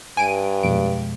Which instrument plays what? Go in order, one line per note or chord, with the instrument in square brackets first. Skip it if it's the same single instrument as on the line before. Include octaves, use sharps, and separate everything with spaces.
[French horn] G2 [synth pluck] G#5 D7 D#7
[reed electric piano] F2 B2 G#3 [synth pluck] D7